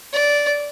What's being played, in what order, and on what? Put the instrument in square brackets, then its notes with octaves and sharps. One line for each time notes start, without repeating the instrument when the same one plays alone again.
[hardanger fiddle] D5